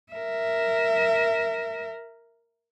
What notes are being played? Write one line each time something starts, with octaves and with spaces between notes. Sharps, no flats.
A#4 E5